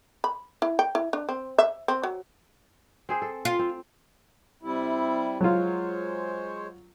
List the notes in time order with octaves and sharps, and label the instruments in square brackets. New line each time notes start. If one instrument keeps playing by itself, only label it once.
[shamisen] B5
E4
G5
E4
D4
C4
E5
C4
F#3
[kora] C4 G#4 C5
A4
[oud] F4
[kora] C4
[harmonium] C3 G3 E4
[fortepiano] F#3 F4 [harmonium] G#3 C5 C#5